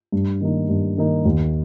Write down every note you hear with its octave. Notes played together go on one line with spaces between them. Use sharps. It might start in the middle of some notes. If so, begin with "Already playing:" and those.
G2
D#3 A#3 D#4
G2
D#3 A#3 D#4
D#2